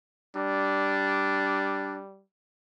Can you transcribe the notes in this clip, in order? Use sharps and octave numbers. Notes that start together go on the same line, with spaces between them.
G3 D4